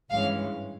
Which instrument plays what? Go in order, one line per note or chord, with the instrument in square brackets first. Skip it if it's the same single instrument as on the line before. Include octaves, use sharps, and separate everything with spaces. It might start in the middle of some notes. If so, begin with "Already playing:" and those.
[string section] G#1 G2 E3 G#3 C#4 F5